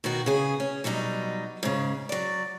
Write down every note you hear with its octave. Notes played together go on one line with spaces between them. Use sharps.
B2 D#3 B3 F#4
C#3 G#4
C#4
B2 F#3 G3 D#4
G#2 C#3
F#3 D5